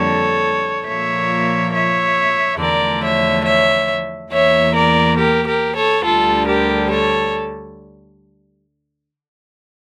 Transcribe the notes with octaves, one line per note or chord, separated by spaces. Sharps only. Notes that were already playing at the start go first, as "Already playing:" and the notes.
Already playing: F2 D3 G3 A#3 A4 C#5
A#2 F3 A#3 C#5 E5
C#5 E5
E2 D3 F3 A3 A#4 D5
C#5 E5
C#5 E5
E2 E3 A#3 C#5 E5
A#4 D5
G4 A#4
G4 A#4
A4 C#5
D2 D3 G3 F4 A4
G4 A#4
A4 C#5